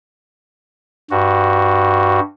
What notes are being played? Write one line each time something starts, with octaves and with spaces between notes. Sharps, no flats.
G2 F#4